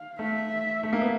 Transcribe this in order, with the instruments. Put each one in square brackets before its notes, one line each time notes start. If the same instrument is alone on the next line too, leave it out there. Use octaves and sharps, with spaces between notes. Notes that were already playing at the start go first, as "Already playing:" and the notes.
Already playing: [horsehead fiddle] F5
[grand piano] A3 [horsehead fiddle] E5
[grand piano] A3
A#3
B3